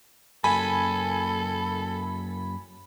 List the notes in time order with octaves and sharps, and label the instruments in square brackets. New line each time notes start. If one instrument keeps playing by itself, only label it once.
[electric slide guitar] F#2 A#3 [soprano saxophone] A4 [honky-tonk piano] G#5 [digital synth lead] B5